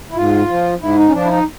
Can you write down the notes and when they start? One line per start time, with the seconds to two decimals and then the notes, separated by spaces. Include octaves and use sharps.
0.11 E4
0.16 G#2 F4
0.49 F3
0.81 G#2 E4
0.97 D#4
1.08 C#4
1.13 F3 D4
1.24 E4
1.29 D#4